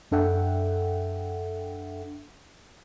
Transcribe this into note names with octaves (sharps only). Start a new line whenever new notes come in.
F#2 D4 A4 E5 F#5 G5